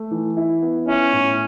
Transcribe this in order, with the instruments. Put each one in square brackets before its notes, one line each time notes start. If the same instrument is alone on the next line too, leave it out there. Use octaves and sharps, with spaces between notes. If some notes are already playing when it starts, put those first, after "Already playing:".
Already playing: [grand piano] A3
E3
E4
B3
[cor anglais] C#4 [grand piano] E4
[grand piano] A2